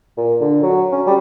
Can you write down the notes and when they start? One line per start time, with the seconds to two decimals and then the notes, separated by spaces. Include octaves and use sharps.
0.17 A#2
0.41 D3
0.63 F#3
0.92 C#4
1.07 G3